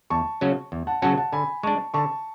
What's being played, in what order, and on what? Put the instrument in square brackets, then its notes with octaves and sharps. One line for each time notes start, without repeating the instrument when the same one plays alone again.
[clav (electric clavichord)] E2 [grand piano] A5 C#6
[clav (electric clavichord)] C#3 F#3 C#4 F#4
E2
[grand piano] F#5 A5
[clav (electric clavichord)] C#3 F#3 C#4 F#4 [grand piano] F#5 A5
[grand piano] F#5 A5
[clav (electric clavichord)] D3 [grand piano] G#5 B5
[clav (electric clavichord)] G#3 D4 [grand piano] A5 C#6
[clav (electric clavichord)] D3 [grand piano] A5 C#6